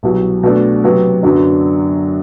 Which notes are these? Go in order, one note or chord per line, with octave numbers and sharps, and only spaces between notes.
C2 B2 F#3
B2 A3 D4
C3 F#3 B3
F#2 D3 F#3 B3 D4